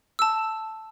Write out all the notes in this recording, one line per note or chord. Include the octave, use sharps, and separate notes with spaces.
A5 E6